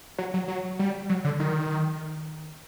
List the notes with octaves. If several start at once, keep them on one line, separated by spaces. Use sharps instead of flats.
F#3
F#3
F#3
G3
F#3
D3
D#3